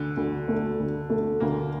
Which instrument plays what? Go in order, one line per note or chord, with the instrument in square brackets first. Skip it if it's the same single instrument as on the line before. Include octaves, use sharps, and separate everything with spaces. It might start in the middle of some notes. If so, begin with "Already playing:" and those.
Already playing: [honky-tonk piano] D2 [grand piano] D3
[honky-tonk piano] D2
A3
D2
A3
[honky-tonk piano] D2 [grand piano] A#3